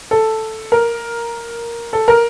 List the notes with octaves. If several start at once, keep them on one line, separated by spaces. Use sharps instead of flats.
A4
A#4
A4
A#4